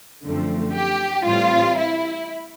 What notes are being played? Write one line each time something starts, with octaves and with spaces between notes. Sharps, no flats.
F#2 D3 F3 A3 C4
G4
A2 E3 G3 C4 F4
E4